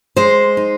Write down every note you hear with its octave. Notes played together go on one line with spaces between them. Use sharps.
G#3 C5
D#4